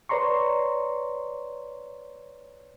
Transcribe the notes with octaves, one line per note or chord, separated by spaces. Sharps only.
B4 C#5 D5 A#5 C6 C#6